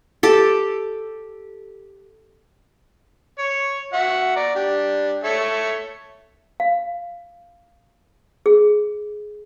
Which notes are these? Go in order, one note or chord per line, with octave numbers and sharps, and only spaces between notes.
G4 A4
C#5
F#4 E5 F#5
D5 A#5
D4 G4
A4 C#5 E5
F5
G#4